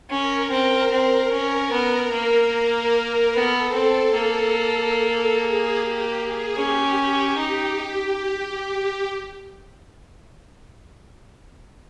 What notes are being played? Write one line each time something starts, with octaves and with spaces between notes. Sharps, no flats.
C#4 A#4
C4 A#4
C4 A#4
C#4 A#4
B3
A#3
B3 A4
C4
A#3
A4
G#4
G4
G#4
C#4 G4
G4
D#4 G4